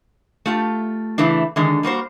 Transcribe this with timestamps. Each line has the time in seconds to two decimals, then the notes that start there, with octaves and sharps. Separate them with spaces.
0.46 A3 F4 G4
1.18 C#3 E3 A3 D4
1.56 D3 D#3 G#3
1.83 G3 A#3 F#4 C5